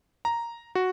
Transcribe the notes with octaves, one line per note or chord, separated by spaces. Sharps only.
A#5
F#4